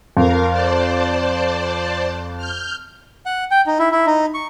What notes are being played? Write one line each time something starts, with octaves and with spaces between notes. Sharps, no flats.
F2 A#4 F5
C5 D5 A5
F6 G6
F#5
G5
D#4
E4
E4
D#4
C#6